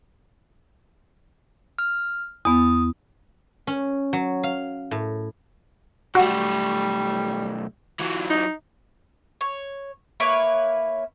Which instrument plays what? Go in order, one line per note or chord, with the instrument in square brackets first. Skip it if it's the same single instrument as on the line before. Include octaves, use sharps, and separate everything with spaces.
[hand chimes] F6
[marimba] E2 B3 [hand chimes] D#6
[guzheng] C#4
F#3
F5
A2
[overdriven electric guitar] B1 A3 [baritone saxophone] G3 [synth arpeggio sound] F#4
[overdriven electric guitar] E3 F#3
[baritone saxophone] D#4
[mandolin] C#5
A#3 E4 B4 C#5